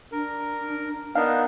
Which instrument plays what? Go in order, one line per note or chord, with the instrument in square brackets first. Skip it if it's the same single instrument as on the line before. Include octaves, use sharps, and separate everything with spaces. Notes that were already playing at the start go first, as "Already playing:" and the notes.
[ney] D4 [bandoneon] A#4
[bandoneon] B3 D4 D#4 [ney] A#4 [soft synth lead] F5